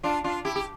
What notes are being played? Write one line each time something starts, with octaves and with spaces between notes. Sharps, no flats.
D4 F4
D4 F4
E4 G4
G4